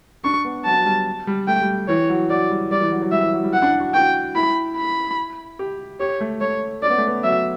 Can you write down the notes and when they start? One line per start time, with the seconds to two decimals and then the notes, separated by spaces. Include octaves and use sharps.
0.24 D4 C#6
0.45 B3
0.65 F#3 A5
0.80 F#3
0.85 G3
1.27 G3
1.48 A3 G5
1.62 G3
1.88 E3 C#5
2.09 F#3
2.30 F#3 D5
2.50 G3
2.71 G3 D5
2.81 E3
2.92 F#3
3.02 F#3
3.12 G3 E5
3.23 E3
3.33 F#3
3.43 G3
3.53 F#5
3.62 D4
3.66 E4
3.80 F#4
3.94 F#4 G5
4.35 E4 B5
4.77 B5
5.59 G4
6.00 G4 C#5
6.21 A3
6.41 A3 C#5
6.82 C#4 D5
6.90 B3
6.98 A3
7.07 B3
7.24 F#3 E5